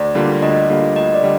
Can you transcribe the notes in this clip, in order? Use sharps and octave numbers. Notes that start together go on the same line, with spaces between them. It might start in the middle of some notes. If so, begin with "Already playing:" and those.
Already playing: D2 D5
D3 G3 A#3 F4
D2 D#5
D3 G3 A#3 F4
D2 D#5
D5
D3 G3